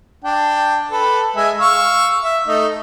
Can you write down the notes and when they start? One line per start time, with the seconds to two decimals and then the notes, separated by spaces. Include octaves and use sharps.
0.24 D4 G5
0.91 A4 B4
1.36 G#3 E5 G#5
1.59 F5 C#6 E6
2.23 E5
2.47 A3 D#4